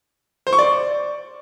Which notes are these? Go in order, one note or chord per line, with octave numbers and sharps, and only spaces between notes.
C5
C#6
D5